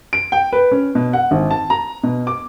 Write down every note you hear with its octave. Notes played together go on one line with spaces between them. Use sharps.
D7
G5
B4
C#4
B2
F#5
G#1
A5
A#5
B2
D6